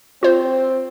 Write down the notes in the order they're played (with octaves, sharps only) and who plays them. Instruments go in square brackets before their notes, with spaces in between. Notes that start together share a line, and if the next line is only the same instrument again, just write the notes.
[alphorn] C4 [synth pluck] F4 C5